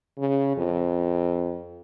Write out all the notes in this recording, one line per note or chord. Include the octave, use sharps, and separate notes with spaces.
C#3
F2